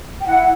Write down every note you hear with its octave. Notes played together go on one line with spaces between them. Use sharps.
G5
E4 F#5